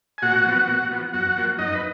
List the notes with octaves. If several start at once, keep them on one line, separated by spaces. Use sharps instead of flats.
G#5
A#2 F#4 F#5
F3 B3
A#2
F3 B3
F#2 F#4 F#5
F3 A#3
F#2 D#4 D#5
B4